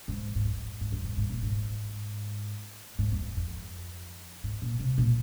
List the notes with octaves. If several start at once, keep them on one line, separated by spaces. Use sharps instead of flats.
G#2
G#2
F2
G#2
F2
G#2
G#2
A#2
G#2
G#2
F2
F2
G#2
A#2
C3
A#2